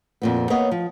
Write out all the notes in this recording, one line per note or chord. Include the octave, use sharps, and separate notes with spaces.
F2 A#2 B3
A#3 B3 C#5 D#5
F3